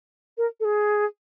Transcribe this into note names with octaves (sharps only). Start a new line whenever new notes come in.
A#4
A4
G#4